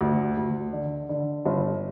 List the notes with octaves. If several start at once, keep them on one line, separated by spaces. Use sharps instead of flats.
D2
D2
D3
D3
G1